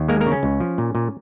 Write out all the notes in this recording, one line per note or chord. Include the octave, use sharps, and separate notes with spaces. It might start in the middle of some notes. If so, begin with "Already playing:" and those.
Already playing: D#2
G#3 A#3 A#4
A#3 A#4
C#3
C#4
C#2
F3
A#2
A#2